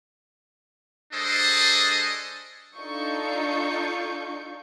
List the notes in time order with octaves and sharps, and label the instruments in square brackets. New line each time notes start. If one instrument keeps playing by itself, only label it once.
[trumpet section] G3 D4 G#4 A4 C5 D#5
[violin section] D4 D#4 F4 A4 C#6 G6